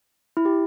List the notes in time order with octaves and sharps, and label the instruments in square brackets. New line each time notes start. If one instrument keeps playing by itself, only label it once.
[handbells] E4
G4